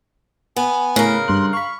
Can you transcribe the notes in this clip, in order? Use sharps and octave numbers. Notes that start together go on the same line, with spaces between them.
B3 G#5
A2 C#3 A#4 B4
G2 C6 F#6
F5 B5 C#6